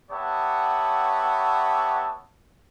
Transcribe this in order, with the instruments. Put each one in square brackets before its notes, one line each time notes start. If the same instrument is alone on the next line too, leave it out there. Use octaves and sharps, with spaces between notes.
[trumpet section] B3 G4 C#5 E5 F#5 A5